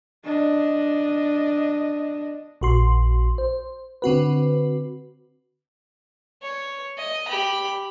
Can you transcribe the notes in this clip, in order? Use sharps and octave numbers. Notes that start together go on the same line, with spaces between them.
D4 D#5
A#1 F#4 C6
C5
D3 C4 F#4 B4
C#5
D#5
G4 B5